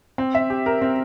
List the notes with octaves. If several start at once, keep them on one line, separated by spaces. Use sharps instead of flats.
C4
E5
G4
A#4
C4